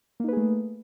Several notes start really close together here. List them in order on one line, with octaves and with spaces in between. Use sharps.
A#3 D#4 B4 G#4 A3